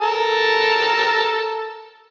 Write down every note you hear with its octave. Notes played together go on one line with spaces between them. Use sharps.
A4 A#4 A5